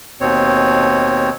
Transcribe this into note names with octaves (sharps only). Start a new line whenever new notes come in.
D#2 B2 C4 C#5